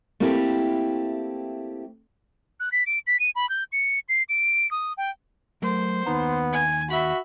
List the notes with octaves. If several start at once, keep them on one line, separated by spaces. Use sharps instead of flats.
A3 A#3 C4 E4 G4
F#6
B6
D7
B6
D#7
B5
G6
C#7
C7
D7
D#6
G5
F#3 A3 A#4 C5
D#2 B3 D#4 A#5
G#5
F#4 E5 B5